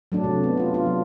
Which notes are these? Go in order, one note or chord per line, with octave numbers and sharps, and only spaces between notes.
F#3 A3 D4
C3
B3
D4 F4
F4
F#3